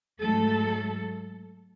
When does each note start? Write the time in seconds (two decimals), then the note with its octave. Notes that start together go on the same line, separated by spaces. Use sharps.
0.20 G#2 F#3 A3 A4